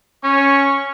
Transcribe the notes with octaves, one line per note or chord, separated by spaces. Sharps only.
C#4 C#6